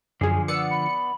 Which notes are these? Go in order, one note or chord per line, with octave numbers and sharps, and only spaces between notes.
F#2 D3 F3 G#4 G#5
B3 D5 E6 F#6 C#7
B5